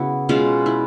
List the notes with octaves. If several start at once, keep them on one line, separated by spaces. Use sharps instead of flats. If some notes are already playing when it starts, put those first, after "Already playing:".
Already playing: C#3 B3 E4 F#4
B2 G#3 C#4 F4
E4